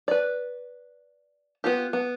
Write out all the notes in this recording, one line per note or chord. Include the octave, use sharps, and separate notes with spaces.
B4 D5
B3 F4 G4
B3